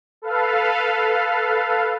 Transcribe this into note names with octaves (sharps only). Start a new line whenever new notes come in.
A4 B4 F5